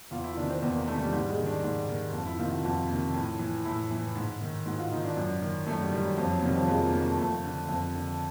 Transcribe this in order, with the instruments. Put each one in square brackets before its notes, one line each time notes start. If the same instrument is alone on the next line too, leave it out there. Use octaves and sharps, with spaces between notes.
[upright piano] E2 F4
E4
C3 D#3 D4
C4
E2 B3
A#3
C3 D#3 A3
G3
G#2 G3
G#3
D#3
D4
G#2
D#3
F2
E4
C3 D#3 F4
F#4
F2 F4
C3 D#3
A2
E3
A2 E4
E3
G#2
D#3
G#2 F#4
F4
D#3 D#4
D4
F#2
D#3
F#2 A3
G3
D#3 G3
F#3
F2 F3
F#3
C3 D#3 G3
F3
F2 G#3
A#3
C3 D#3 A#3
A3
F2 A3
D3
F2
D3